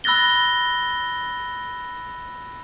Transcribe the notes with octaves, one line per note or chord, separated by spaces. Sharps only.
B5 E6 F#6 A6 A#6 G7